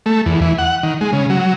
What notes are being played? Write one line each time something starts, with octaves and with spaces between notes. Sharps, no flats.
A3
E2
E3
F#5
D#3
G#3
C#3
F#3